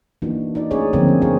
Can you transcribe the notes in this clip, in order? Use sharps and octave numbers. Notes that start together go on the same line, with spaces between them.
E3 A#3 D4 D#4 F#4
D#4 D5
A3 C#4 E4 G#4 C#5 D5
D3 F3 A3 A#3 C4 A#4
C#4
C#4 D4 F4 G#4 A#4 C#5